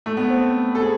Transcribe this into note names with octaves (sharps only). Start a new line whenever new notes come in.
A3
B3
C4
A4
G#4